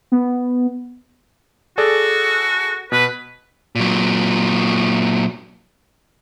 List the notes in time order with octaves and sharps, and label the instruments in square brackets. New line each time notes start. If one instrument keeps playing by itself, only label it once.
[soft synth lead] B3
[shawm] F#4 [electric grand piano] G#4 A4 D5
[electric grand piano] B2 [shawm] B4
[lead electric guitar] A#2 F#3